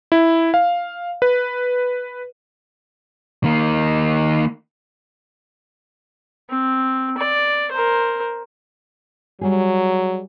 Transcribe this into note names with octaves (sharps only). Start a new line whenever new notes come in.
E4
F5
B4
D#3 A#3
C4
D5
A#4 C5
F#3 G3 G#4